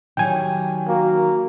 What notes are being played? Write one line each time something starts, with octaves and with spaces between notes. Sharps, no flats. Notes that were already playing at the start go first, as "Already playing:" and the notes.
D#3 F#3 G3 G5 G#5
A#3 F#4